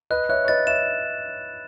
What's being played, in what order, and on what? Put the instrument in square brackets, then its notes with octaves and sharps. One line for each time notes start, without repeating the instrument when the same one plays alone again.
[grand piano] B4 D#5 [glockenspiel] F#6
[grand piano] C#5 E5 [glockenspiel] F#6
[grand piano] C#5
[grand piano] B4 D#5 [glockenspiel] A6
[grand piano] C#5 E5 [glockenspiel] E7